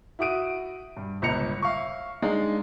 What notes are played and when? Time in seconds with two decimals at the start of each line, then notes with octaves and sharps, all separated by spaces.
0.19 E4 F#4 D#6 D7 D#7
0.97 G2
1.22 G1 C#2 A#6 C#7 F7
1.62 E5 F5 C#6
2.22 G#3 D4 D#4 F5